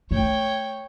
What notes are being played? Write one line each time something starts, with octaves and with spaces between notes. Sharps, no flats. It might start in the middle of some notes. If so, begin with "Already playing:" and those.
A3 C#5 G5